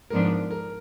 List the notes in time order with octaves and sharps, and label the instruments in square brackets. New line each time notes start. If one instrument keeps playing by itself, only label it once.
[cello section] G#2 F3 B3 D4 [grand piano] A#4
[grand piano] A#4